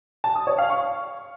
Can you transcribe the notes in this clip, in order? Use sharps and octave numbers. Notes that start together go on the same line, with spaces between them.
A5
D#6
C#5
F5
C#6